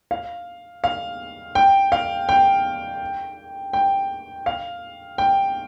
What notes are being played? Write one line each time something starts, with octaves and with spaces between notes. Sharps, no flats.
F5
F5
G5
F5
G5
G5
F5
G5